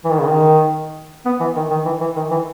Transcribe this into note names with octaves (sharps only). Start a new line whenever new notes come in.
E3
D#3
C#3
D#3
B3
E3
D#3
D#3
E3
E3
D#3
E3